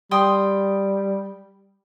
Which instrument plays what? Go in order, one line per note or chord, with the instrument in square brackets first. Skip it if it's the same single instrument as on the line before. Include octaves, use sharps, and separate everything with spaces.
[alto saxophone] G3 [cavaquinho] G5 C6 D#6